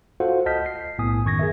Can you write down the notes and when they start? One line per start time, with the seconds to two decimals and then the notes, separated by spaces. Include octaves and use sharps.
0.20 F4 F#4 A4 C5 F5 F#5
0.46 C#2 D#5 A5 F6 G6 B6
0.66 C7
0.98 B1 A2 B3 G#5 D#6
1.25 F#2 D#3 C#6 G#6 A#6
1.39 G#4 A#4 E5